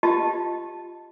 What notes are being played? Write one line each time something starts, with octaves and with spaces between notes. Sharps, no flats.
F4 G4 D#5 A5